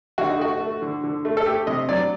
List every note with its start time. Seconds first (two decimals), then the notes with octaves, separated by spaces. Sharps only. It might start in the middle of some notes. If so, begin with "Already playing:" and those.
0.18 D3 F#4
0.30 D#4
0.39 A3 F#4
0.61 A3
0.82 D3
1.04 D3
1.25 A3
1.37 A4
1.46 A3 G4
1.67 C3 D#5
1.89 F#3 D5